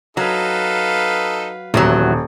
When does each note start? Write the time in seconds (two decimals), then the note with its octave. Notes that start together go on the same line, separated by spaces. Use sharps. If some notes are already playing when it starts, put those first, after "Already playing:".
0.17 F#3 D#4 A4 B4 F5
1.74 D#1 E2 E3 F#3